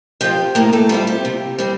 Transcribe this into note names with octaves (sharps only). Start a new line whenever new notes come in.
F3 C4 F4 G4 G5
A2 A#3 A#4
A3 A4
G3 C4 E4 F4
G4
C3
G3 C4